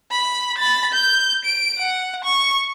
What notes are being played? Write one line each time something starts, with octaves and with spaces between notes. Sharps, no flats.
B5
B5 A6
G6
D7
F#5
C#6